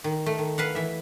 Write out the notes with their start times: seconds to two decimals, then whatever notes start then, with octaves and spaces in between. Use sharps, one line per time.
0.04 D#3
0.26 A3
0.38 D#3
0.58 B4 F5 F#5
0.75 E3 E5